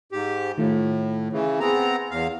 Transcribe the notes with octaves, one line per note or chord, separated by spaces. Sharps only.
G#2 G4
A2 D#3 A3 F4
C#3 E3
B3 C4 G#4 A#5
E2 F5